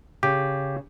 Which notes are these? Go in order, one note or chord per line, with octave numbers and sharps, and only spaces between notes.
C#3 G4